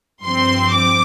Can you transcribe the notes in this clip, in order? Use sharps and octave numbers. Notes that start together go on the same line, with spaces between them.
G2 F3 C4 C6
D6